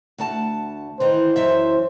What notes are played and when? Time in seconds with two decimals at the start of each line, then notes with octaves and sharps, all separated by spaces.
0.18 D2 F#5 A5
1.00 D#3 E3 C5
1.36 F#2 E3 E5